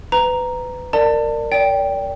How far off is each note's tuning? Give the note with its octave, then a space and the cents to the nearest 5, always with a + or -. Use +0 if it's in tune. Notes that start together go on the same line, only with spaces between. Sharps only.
B4 +25 A#5 +0
A#4 -20 D5 +15 A5 +30
D5 -35 G5 +0